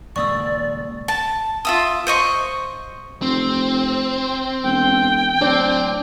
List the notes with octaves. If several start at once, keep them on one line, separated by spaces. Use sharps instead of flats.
D#1 C#2 A#3 D5 C#6 D#6 E6
A5
F4 E5 D#6
C5 D#5 C#6
F1 C4
E1 G5
D1 C4 D4